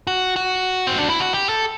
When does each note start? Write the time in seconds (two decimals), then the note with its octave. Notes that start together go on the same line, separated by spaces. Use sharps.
0.07 F#4
0.36 F#4
0.87 C4
0.98 D4
1.09 E4
1.20 F#4
1.34 G4
1.49 A4